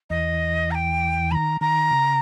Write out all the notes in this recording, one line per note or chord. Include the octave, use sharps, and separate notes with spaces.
E2 E3 D#5
A#5
G5
D#3 A#5 B5
D#3 A#5
C#3